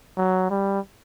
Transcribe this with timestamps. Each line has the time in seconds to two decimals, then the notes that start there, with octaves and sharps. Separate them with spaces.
0.17 F#3
0.50 G3